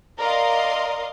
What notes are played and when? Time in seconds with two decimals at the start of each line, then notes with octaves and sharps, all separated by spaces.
0.19 A#4 D5 D#5 F5 C6